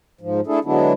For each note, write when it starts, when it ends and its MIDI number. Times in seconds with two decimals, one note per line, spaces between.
0.21 0.41 44
0.21 0.41 53
0.47 0.59 57
0.47 0.59 62
0.47 0.59 64
0.47 0.59 68
0.47 0.59 69
0.65 0.93 50
0.65 0.93 54
0.65 0.93 56
0.65 0.93 59
0.65 0.93 62
0.65 0.93 64